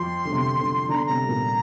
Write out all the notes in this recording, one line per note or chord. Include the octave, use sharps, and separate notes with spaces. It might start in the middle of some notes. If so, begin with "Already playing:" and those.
Already playing: F2 F3 C6
D3
C3
D3
C3
D3 D4 A#5
C6
C3 C4 A#5
G3
A#2 A#3